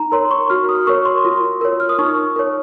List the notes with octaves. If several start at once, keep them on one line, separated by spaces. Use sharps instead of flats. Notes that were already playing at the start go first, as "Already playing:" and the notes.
Already playing: D#4 A#5
A#4 C#5 C6
C#6
F#4 F6
D#6
A#4 C#5 C#6
C6
F4
A#4 C#5
F6
D#6
D#4 C#6
A#4 C#5